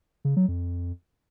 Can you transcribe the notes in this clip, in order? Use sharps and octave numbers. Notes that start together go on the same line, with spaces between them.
C#3
F#3
F2